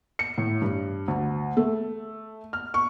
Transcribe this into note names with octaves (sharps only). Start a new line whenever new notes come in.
C#7
A2
G2
D2
A3
F6
C#6